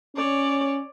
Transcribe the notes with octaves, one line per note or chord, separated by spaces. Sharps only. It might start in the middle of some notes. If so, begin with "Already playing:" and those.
C#4 C#5 D5